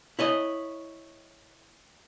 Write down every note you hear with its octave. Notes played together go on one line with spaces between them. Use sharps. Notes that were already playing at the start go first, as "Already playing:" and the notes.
E4 C#5 D#5